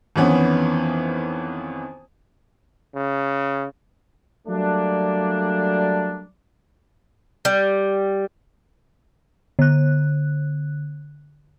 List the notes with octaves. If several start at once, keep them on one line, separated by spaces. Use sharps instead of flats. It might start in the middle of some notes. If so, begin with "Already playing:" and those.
F2 D#3 E3 B3 C#4
C#3
F#3 G3 A3 A#3 D4
G3
D3 F#6